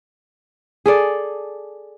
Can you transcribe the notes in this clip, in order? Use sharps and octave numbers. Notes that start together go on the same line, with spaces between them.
G#4 A4 D5